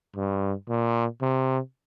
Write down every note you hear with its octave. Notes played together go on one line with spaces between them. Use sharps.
G2
A#2
C3